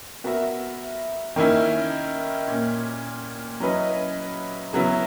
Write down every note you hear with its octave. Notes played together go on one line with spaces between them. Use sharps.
B3 F#4 A#4 E5
D#3 A#3 C#4 E4
A#2 A#3 C#4
F#3 C#4 E4 B4 D#5
C#3 F#3 B3 E4